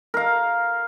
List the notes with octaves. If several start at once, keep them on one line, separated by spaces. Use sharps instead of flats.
A#4 F5